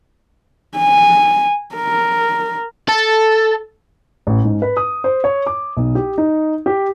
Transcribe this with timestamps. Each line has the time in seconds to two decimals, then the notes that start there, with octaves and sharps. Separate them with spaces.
0.78 G#5
1.76 A#4
2.89 A4
4.27 A1
4.44 G#2
4.62 B4
4.77 D#6
5.04 C5
5.24 C#5
5.47 D6
5.77 B1
5.95 G4
6.18 D#4
6.66 G4